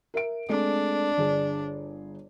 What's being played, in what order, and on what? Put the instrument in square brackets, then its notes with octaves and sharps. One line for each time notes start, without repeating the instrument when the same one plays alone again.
[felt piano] A#4 E5 D7
[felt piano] G#3 A3 C4 [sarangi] D4
[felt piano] G1 G#4